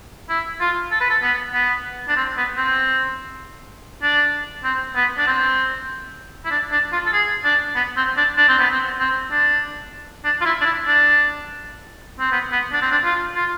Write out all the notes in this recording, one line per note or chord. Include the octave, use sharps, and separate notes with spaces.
E4
F4
A4
B4
A4
B3
B3
D4
C4
B3
C4
D4
C4
B3
D4
C4
E4
D4
D4
F4
A4
G#4
D4
B3
C4
D4
D4
C4
B3
C4
C4
D4
D4
F4
E4
D4
E4
D4
C4
B3
B3
D4
C4
D4
F4
F4